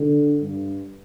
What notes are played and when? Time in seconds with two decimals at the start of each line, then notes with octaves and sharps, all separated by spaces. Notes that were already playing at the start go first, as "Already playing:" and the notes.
Already playing: D3
0.41 G2